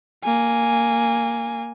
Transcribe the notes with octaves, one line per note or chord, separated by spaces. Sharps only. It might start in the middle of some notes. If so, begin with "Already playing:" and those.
A#3 G#5